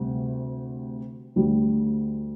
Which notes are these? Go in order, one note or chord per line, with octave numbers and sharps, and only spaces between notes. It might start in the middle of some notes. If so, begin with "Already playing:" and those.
Already playing: D2 C3 G3
D2 D3 G3